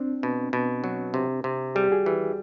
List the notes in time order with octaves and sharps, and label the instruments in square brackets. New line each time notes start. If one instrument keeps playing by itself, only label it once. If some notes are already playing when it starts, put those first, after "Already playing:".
Already playing: [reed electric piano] C4 D4
[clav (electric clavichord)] B2
B2
F#3
C3
C3
[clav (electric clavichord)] G3 [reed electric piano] G#4
[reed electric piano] G4
F#4 G#4
[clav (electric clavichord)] E3